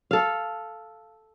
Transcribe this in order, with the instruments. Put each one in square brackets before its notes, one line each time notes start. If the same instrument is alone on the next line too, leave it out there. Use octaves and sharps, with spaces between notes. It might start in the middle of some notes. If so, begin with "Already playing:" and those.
[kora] A4 F5